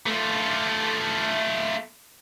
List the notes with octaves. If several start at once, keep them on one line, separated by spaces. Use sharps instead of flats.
A3 F4